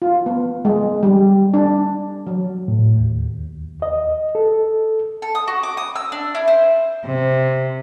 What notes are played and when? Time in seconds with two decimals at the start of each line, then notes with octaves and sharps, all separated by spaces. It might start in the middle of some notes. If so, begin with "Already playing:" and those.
0.02 F4
0.26 B3
0.65 G#3
1.03 G3
1.54 D4
2.27 F#3
2.68 A2
2.99 D#2
3.82 D#5
4.35 A4
5.22 A4
5.35 D#6
5.48 F#4
5.63 D6
5.77 D#6
5.95 E6
6.12 D4
6.35 E4
6.48 C5
7.05 C3